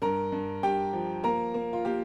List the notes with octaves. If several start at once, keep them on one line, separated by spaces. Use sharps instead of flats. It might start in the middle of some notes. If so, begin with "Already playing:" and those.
G2 A#4 A#5
G2
G2 G4 G5
F3
A#3 A#4 A#5
A#3
F4
A#3 G4